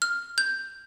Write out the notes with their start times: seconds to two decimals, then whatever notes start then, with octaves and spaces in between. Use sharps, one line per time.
0.02 F6
0.38 G6